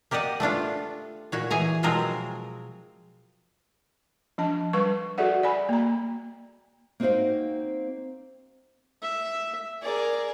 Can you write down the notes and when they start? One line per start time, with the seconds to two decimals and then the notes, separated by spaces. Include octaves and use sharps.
0.11 A#3 G4 D5 D#5 F#5
0.40 A3 B3 D4 F4
1.32 A#2 F#4 C#5
1.51 E3 G#4 G#5 A#5
1.83 B2 F3 F#3 G#3 C4 A#4
4.38 F3 D4 A5
4.73 G3 B4 C#6
5.18 F#4 G#4 A4 D5 E5 F#5
5.43 D5 G#5 B5
5.69 A#3 A#5
7.00 A#3 C4 D#4 F#4 C5 F5
9.02 E5
9.82 G#4 A#4 D5